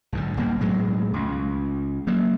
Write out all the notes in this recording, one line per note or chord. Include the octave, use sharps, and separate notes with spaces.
B1 G#2 D3
F#1 B2 G3 A#3
B1 A2 F#3 G#3
C#2
F#3 A#3